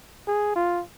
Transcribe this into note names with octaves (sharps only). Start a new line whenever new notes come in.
G#4
F4